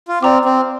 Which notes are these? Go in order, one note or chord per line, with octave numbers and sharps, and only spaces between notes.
F4
C4 D5 A#5 D6
C4